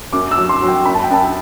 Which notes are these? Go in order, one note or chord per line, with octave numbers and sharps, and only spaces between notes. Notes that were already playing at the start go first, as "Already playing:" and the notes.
F#2 D6
E6
F#3
C6
F#3
G5
F#2 B5
A5
G5
F#2 A5